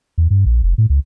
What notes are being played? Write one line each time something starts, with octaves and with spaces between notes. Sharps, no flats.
E2
G2
A#1
F1
A2
C#2